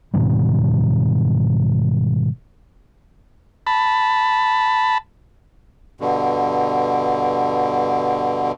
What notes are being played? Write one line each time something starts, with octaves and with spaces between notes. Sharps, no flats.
G#2 B2 D#3 G3
A5 B5
G2 B2 D3